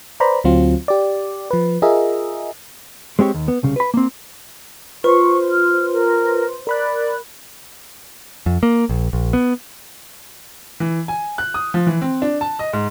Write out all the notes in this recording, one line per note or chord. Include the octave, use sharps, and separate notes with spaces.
B4 C5 D5 A#5 B5
D2 F#3 C4 F4
G4 D5
F3 B4
F4 G#4 A#4 D#5 E5
G#3 C4 G4 C#5
D#2
B3
C2 C#3
B4 B5
A#3 C4
F4 B4 C5 C6 C#6
F6
A#4
A#4 D5 B5 F#6
F2
A#3
A#1
A#1
B3
E3
G#5
F#6
D#6
F3
E3
C4
D4
A5
D#5
G#2